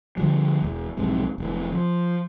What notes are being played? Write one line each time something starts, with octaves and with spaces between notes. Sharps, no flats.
D3 F3 G3
E1 E2
B1 F2 G#2 C3
F1 E3
F3